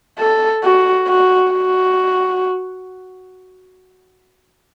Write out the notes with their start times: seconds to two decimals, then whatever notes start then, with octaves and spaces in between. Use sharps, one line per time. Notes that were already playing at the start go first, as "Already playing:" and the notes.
0.19 A4
0.63 F#4
1.08 F#4
1.52 F#4